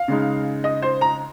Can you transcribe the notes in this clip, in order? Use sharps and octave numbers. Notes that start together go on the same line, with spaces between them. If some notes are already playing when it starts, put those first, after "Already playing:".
Already playing: F5
C#3 G#3 D#4
D#5
C5
A#5